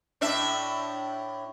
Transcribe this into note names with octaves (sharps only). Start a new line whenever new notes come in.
A2 D4 E5